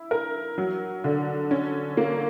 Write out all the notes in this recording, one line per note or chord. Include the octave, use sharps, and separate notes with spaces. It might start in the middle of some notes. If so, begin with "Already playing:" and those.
Already playing: E4
A#4
F#3
D3
C#4
A#3